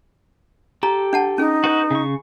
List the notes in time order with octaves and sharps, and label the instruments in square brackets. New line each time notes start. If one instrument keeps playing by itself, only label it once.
[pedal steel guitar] G4 A4 [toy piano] A#5
[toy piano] D4 F#5 A5
[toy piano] C#4 G#4 [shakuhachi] D#4
[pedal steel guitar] F#4 B4 G6
C#3 C#6